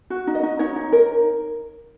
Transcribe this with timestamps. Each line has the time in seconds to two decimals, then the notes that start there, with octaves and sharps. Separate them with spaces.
0.10 F#4
0.27 D#4
0.35 D#5
0.43 D#4
0.59 D#4 C#5
0.76 D#4
0.92 A#4